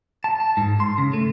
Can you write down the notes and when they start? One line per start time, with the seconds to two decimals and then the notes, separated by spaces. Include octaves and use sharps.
0.24 A5
0.40 A5
0.57 G#2
0.80 C6
0.98 C#3
1.13 A3